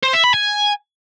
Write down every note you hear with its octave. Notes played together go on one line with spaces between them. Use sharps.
C5
E5
B5
G#5